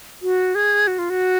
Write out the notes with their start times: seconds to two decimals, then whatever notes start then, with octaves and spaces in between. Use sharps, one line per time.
0.22 F#4
0.55 G#4
0.87 F#4
0.99 F4
1.10 F#4